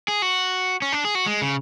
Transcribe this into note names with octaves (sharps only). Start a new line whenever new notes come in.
G#4
F#4
C#4
D4
G#4
F#4
G#3
C#3